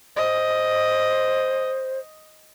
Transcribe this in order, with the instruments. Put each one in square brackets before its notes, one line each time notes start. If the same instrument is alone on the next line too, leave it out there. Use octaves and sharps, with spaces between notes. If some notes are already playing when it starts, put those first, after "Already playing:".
[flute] C5 [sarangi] D#5